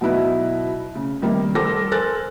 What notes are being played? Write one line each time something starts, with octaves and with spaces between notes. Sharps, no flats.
B2 F#3 D#4 E4 B4
C#3
C3 D#3 G3 A#3
G3 A4 A#4 C5 D6 A#6
A4 A#4 C5 G#5 F#6 A6